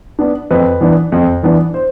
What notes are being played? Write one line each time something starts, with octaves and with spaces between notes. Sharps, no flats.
B3 D4
F2 B4
E3 B3 D4
F2
E3 B3 D4
C5